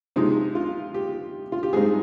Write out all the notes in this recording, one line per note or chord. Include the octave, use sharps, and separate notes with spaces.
C3 F3 G#3 D#4
F4
G4
F4
G4
G#2 G3 C4 D#4 G#4